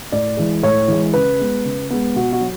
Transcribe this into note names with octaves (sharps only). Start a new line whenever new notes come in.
A2 D5
E3 G#3
A2 C#5
E3 G#3
C#3 B4
G#3 B3
C#3
G#3 B3
B2 F#4
F#4
F#3